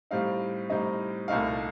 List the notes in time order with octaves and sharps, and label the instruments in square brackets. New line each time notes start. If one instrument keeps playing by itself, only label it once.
[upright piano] A2 G3 C4 D#4 F5
A2 G3 C4 D#4 D#5
C2 A#2 A3 D#4 F5